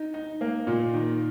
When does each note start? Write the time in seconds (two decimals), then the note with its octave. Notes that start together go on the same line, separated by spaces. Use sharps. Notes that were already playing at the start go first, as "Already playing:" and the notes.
Already playing: D#4
0.14 D#4
0.41 A#3
0.67 A#2
0.94 D#3